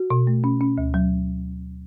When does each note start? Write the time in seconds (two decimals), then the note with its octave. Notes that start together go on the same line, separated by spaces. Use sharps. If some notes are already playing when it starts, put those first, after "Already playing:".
Already playing: F#4
0.10 B2
0.27 A3
0.44 C#4
0.61 C#4
0.78 D2
0.94 F#3